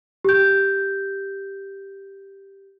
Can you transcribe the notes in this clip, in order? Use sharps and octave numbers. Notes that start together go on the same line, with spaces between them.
G4 G6